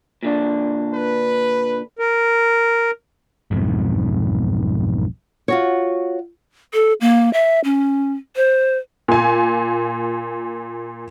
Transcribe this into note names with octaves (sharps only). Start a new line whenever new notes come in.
A#2 D3 D4
B4
A#4
B1 F2 G#2
F4 F#4 C#5
A4
A#3
E5
C#4
C5
A#2 G#5